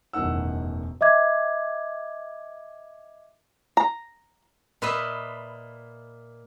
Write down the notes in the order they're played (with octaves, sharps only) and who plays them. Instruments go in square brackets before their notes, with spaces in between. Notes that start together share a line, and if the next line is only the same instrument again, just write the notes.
[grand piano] E1 F#2 A2 D#3 F#5 E6
[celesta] D#5 E5 D6 G#6
[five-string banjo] A#5
[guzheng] A#2 B4 D#5 E5 B5